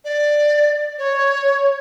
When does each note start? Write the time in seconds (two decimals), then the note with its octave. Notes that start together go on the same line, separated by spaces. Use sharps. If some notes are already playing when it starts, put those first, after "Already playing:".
0.05 D5
0.98 C#5